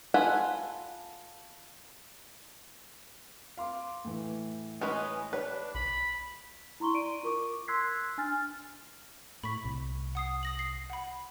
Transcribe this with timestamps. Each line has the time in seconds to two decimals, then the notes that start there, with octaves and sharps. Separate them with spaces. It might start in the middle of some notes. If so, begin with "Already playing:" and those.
0.14 F4 A4 F#5 G#5 B5
3.57 F5 C6 D6
4.04 A2 E3
4.81 G#3 C#4 B4 D#5
5.33 D4 G4 B4 C#5
5.75 B1 B5
6.80 E4 A#5 C6 C#6 G7
6.94 D5 D7 D#7
7.23 F4 A#4 C#6 D6
7.68 C6 E6 F#6 G#6 B6 C7
8.18 D4 G#5 F6 A6
9.44 A2 B5 C#6 B6
9.65 C2
10.15 F#5 D#6 C7
10.43 D#6 A#6 F#7
10.59 C7
10.90 F#5 B5